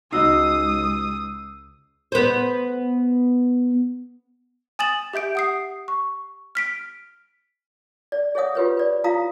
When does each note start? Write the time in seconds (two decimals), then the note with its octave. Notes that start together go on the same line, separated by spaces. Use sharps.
0.12 C#2 G#3 D#4 F#4 D#5 D#6 E6 C7
2.12 B3 C5
4.79 G#5 D#6 A6 E7 F#7
5.13 G4 E5 G6 D7
5.35 F#5 D#6 C7
5.88 C#6
6.55 F6 B6 D7
8.12 D5
8.35 G#4 C#5 E5 F#5 D#6
8.55 F4 G4 B4 C#5
8.77 B4 D5
9.04 E4 F4 F5 A#5 D#6